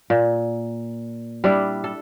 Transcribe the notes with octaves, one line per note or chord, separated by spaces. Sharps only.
A#2
G3 D4 E4
A4